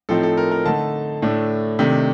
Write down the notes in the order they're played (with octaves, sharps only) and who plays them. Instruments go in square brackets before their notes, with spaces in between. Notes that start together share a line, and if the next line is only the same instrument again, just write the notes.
[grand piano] A2 F3 C4 D#4 A4
A4
A#4
A#4
D3 A3 D#4 A5
A2 A3 D4
C3 D#3 A3 D4